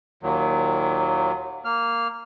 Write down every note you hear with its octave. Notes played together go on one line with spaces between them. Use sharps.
D#2 A#2 D#3 F#3
A#3 F6